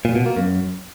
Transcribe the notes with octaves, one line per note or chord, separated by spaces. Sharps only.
A#2
B2
A#3
F#2